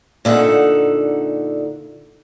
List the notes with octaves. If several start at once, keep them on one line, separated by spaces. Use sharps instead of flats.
A#2 D3 D#4 E5 F#5